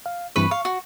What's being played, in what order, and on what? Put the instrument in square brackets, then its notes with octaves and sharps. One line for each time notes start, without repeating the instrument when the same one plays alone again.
[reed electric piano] F5
[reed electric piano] G2 E3 C4 [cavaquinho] B4 B5 C#6
[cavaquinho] F5 [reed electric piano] C#6
[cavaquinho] F#4